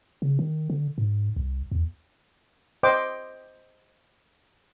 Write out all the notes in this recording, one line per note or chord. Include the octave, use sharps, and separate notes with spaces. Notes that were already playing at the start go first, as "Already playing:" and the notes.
C#3
D#3
D3
G#2
C2
E2
C5 D#5 G5 D6